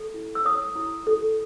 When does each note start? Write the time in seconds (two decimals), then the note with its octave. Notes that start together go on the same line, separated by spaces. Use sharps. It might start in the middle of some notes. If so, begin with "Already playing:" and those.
Already playing: A4
0.14 E4
0.35 E6
0.45 C#5 D#6
0.76 E4
1.07 A4